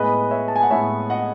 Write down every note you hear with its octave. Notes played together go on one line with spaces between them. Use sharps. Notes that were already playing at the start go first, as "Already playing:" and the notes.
Already playing: A2 G#3 B3 B4 D#5
C#5 E5
A5
G#5
F#5
A2 G#3 B3 C#5 E5
D#5 F#5